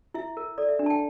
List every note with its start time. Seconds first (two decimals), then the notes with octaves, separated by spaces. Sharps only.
0.14 E4 E5
0.37 A#4
0.58 A4 D5
0.69 E5
0.79 D4
0.86 A5
0.90 G5